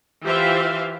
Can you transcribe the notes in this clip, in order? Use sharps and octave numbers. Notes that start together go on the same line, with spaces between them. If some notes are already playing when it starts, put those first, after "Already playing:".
E3 F4 G4 C5 E5 F5